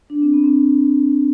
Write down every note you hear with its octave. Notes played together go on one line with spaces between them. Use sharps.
D4
C4
B3
C4